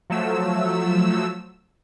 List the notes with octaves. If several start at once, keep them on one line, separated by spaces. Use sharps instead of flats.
F3 F#3 A3 E6